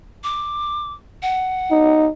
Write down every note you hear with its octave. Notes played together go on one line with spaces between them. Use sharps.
D6
F#5
D#4